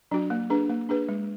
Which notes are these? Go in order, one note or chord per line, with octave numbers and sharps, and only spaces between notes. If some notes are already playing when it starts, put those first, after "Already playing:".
F#3 D4 F#4
A#3
D4 G#4 B4
A#3
D4 G#4 B4
G#3